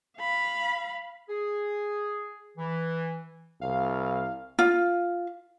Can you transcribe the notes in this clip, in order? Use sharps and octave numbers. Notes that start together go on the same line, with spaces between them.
F5 B5
G#4
E3
C2 F5
F4